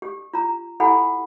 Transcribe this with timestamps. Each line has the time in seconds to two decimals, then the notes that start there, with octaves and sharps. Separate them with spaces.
0.02 G4
0.34 F4 A#5
0.80 E4 G4 A4 F#5 G#5 B5